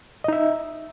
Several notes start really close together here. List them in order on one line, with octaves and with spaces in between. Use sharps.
D#5 D#4 E5